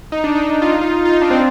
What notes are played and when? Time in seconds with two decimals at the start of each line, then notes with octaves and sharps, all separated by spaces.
0.12 D#4
0.24 D4
0.35 D#4
0.62 F4
0.72 D#4
0.82 F4
1.05 F4
1.13 D#4
1.22 D4
1.31 C4